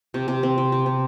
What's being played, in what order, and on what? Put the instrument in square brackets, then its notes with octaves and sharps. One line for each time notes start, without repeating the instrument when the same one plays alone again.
[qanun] C3
C3
C4
C3
C3
C3